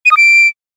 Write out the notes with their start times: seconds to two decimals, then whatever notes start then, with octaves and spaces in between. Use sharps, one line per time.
0.05 D#7
0.11 D#6
0.17 D7